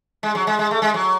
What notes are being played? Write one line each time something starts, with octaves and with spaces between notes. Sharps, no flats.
G#3
F#3
G#3
G#3
A3
G#3
F#3